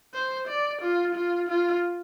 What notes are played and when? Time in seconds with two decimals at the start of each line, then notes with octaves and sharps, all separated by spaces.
0.14 C5
0.48 D5
0.82 F4
1.15 F4
1.49 F4